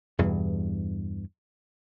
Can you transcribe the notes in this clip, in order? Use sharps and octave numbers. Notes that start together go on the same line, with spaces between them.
E2 G2 B2 E3